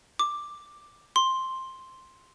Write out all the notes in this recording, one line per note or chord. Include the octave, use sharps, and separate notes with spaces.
D6
C6